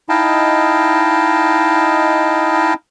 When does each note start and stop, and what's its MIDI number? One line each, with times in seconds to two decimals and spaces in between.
0.09 2.74 63
0.09 2.74 64
0.09 2.74 75
0.09 2.74 77
0.09 2.74 79
0.09 2.74 81